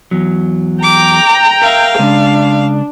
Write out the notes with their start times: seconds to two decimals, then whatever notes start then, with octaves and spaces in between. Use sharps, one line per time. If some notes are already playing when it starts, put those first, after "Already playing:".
0.11 E2 F#3
0.83 G5 A#5 D6
1.62 A#4 E5 F5
1.99 C#3 G#3 D4